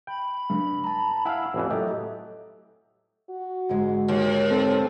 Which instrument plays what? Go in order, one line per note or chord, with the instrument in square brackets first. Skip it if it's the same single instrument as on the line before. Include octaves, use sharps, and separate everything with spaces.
[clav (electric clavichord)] G5 [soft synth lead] B5
[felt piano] G2
[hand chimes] A5 A#5
[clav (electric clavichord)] E4 F5 [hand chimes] F#5 G#5 E6
[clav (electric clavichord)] A1 F2 E3
[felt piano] A2 [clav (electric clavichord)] F#3 G4 [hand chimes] A4 D#5 E5
[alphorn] F#4
[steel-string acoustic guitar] G#2 D3 G#3
[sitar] D#2
[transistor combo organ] C4 A4